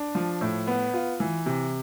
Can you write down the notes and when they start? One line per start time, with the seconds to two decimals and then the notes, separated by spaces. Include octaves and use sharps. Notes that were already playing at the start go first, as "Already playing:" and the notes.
Already playing: D4
0.15 F3
0.41 A2
0.67 B3
0.93 F4
1.20 E3
1.46 C3